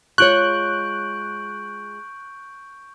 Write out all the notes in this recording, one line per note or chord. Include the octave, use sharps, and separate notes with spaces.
G#3 F4 C#5 C#6 F#6 G6 D7